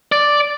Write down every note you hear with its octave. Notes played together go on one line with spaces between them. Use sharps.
D5